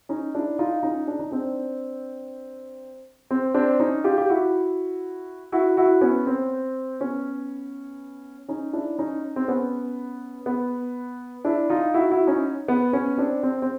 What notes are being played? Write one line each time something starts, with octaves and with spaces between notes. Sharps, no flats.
C#4 D#4
D4 E4
D#4 F4
C#4 D#4
D4
D#4
C4 D4
C4
C4 D4
C#4 D#4
F4 G4
G4
E4 F#4
E4 F#4
E4 F#4
B3 C#4
C4
B3 C#4
C#4 D#4
D4 E4
C#4 D#4
C4
B3 C#4
B3
D4 E4
D#4 F4
E4 F#4
E4 F#4
C#4 D#4
B3
B3 C#4
C4 D4
C4
C4